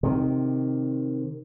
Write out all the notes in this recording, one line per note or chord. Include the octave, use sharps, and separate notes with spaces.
C3 D#3